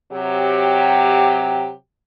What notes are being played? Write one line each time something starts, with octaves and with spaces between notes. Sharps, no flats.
C3 F#3 G4